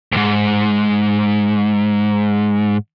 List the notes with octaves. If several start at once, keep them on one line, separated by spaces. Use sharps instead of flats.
D2 G#2